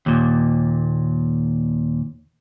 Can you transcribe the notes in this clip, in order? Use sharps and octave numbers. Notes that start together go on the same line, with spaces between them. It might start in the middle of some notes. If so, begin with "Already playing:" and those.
D#2 A#2